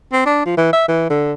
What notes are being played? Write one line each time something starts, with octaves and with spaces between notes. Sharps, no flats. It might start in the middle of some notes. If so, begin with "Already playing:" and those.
C4
D4
F3
E3
E5
E3
D3